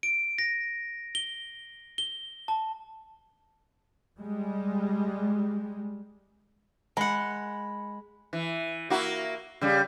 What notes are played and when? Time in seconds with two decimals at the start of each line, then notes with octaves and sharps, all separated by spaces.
0.03 D7
0.38 A#6
1.15 G7
1.98 G7
2.48 A5
4.18 G3 G#3
6.97 G#3 F#5 B5
8.33 E3
8.90 A#3 E4 F#4
9.61 C#3 G3